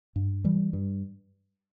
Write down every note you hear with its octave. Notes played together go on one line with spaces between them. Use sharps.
G2
E3 G3
G2